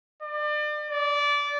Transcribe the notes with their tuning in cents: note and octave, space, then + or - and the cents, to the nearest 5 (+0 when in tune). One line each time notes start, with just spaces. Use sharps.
D5 +35
D5 -20